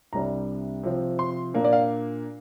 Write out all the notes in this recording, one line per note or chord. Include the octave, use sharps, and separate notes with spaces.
C2 C3 G3 D4 A#5
C3 F3 C4
C6
A#2 A#3 D4
D5
F5